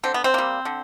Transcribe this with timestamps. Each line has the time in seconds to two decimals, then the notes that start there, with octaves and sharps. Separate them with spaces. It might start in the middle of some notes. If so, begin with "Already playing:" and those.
0.03 D3 C4
0.14 B3
0.24 C4
0.34 G3 A#3
0.65 D3